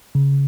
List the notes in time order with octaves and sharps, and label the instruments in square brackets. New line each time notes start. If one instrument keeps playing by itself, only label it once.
[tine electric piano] C#3